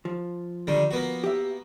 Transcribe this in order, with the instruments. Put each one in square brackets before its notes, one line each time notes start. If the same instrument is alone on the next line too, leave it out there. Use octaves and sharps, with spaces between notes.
[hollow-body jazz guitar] F3
[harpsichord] D3 D#3 G3
A#3 B3 F#4
[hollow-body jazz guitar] G4 E5